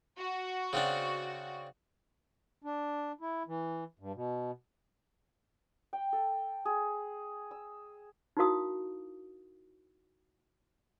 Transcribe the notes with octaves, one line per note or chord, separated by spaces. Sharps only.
F#4
C#3 C4 D4
D4
E4
E3
G2
B2
G5
A4
G#4
E6
D#4 E4 F#4 A#4 F5 D#6